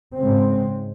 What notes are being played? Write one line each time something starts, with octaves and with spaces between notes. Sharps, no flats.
G#2 C#3 G#3 C4